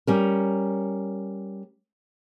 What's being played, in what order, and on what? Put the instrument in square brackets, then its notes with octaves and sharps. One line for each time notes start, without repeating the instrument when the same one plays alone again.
[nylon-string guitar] G3 C#4 A#4